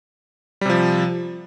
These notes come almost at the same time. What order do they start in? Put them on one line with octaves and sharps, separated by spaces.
G3 C3 F3